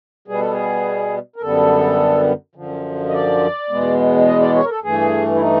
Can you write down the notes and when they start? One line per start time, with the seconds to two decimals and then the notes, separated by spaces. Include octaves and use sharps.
0.28 B2 G3 B3 G#4
0.40 A4
0.52 G#4
1.36 A#4
1.42 F#2 D3 G3 B3 A4
2.55 F#2 D3 F3
3.08 D#5
3.14 D5
3.70 E2 B2 G#3 B3
4.27 D#5
4.41 D5
4.55 C#5
4.64 A#4
4.70 A4
4.84 G2 E3 A3 G#4
5.35 E4
5.41 D#4